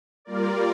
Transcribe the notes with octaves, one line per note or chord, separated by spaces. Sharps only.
G3 A#3 F4 A#4 D5